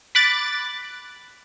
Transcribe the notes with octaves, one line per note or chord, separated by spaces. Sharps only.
B5 D6 F#6 A6